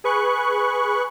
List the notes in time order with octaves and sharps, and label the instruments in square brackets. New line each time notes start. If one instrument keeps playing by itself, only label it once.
[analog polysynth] G#4 B4 C#6 F#6